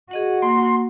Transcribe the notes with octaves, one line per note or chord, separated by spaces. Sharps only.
F#4 G#4 D#5 F#5
A#3 C6